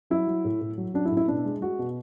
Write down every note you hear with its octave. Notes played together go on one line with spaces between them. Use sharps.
F#3 E4
F#3
A2
A2
F#3
F#3 D4
E4
A2
E4
B2 D4
G#3
G#3 F#4
B2